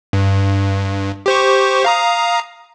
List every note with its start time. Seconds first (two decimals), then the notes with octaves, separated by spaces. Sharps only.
0.13 G2
1.26 G4 C5 C#6
1.85 F5 A#5 D#6